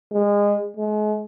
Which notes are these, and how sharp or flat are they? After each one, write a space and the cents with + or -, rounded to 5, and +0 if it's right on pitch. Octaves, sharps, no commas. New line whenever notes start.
G#3 -25
G#3 +35